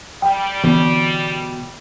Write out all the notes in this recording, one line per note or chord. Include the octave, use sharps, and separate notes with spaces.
G3 G5
B2 D3 E3 B3